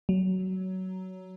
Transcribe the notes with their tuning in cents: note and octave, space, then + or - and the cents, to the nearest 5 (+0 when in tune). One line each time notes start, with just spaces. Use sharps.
F#3 +15